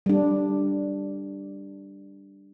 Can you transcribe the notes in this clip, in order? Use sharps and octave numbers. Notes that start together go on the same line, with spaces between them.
G3 D4